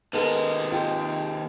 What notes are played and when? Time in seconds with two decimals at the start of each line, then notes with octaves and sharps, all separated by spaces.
0.13 D#2 G#3 B3 A4 A#4
0.72 F4 G#4 G5